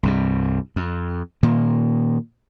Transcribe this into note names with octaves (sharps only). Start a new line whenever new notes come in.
C2 G2 C3
F2
A#2 D#3 A#3